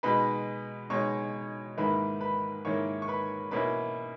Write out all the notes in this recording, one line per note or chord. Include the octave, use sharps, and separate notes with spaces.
B2 G#3 D#4 B4 B5
B2 G#3 D#4 C#5 C#6
G#2 D#3 A#3 E4 B4 B5
B4 B5
G#2 D#3 A#3 E4 C#5 C#6
C#6
B4 B5
B2 A#3 C#4 E4 B4 B5